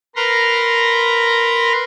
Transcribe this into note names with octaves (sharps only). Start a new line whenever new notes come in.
A#4 B4 A#5 C6